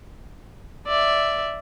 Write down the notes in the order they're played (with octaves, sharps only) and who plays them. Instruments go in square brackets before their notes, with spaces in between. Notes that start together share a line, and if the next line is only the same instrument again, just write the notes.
[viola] D5 E5